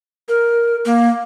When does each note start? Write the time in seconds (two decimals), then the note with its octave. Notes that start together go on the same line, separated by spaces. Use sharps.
0.29 A#4
0.86 A#3